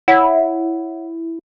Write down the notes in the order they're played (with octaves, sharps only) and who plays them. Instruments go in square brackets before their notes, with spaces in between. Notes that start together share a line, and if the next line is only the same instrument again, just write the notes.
[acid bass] E4 [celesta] C#5 F#5